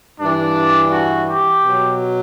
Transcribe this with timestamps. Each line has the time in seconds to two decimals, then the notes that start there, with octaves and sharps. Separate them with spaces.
0.20 G2 E3 D4
0.91 F#4
1.28 G4
1.63 B2 F#3